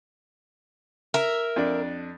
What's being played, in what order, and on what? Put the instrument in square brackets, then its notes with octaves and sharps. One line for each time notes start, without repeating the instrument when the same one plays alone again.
[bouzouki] A#4 E5
[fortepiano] F2 D4 D5